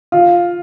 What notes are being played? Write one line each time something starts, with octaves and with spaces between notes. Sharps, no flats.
F4